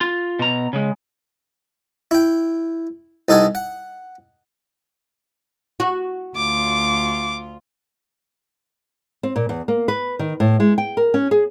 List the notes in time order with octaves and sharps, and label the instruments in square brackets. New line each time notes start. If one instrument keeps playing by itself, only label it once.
[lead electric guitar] F4
B2 A#5
C#3 G#3
[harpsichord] E4 G5
C2 D#4 A4 F#5 G#5 D#6
F#5
[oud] F#4
[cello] D2 F4 [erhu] D6
[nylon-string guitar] C4
A#2
E2
A#3
B4
D#3
A2
G#3
G5
A#4
C#4
G#4